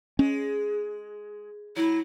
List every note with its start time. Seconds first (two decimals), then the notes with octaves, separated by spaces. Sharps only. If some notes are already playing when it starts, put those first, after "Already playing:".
0.19 G#3 C#4
1.77 F#3 E4